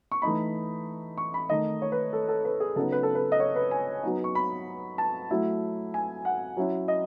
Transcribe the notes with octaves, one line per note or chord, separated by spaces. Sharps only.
C#6
E3 A3 D#4 B5
C#6
B5
D#3 A3 D#4 D#5
C#5
B4
A4
A4
B4
G#4
C#3 F#3 B3 D#4 A4
B4
A4
B4
D#5
C#5
B4
G#5
F#3 B3 D#4
C#6
B5
A5
F#3 A3 E4
G#5
F#5
F#3 C#4 E4
D#5